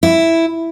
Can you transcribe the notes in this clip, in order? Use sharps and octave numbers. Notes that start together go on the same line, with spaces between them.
E4